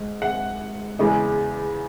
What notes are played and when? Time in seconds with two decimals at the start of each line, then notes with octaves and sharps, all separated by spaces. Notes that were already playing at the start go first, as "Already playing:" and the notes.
Already playing: G#2
0.22 F#5
0.99 E2 C#3 G#3